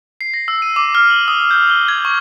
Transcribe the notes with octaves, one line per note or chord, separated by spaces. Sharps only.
C7
A#6
E6
D#7
D6
F6
F#7
D#6
G6
G7
G#6
C#6